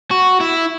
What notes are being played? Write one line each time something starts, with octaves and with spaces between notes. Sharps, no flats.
F#4
E4